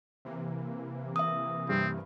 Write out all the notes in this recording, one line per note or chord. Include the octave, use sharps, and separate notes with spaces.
C3 E3 A#3
E5 D#6
G2 C4